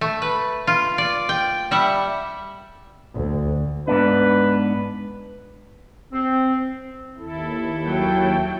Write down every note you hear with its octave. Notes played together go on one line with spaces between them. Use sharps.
A3
B4
F4
D5
G5
G3 E5 F#5
D2
G#2 B3 D4 B4
C4
D#2 E4 A4
F#3 G5